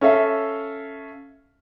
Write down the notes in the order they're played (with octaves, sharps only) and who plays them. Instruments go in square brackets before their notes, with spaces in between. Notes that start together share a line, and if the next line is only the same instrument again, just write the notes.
[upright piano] C#4 A4 E5 F5